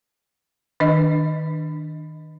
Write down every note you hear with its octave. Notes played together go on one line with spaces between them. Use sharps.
D#3 D4 D#5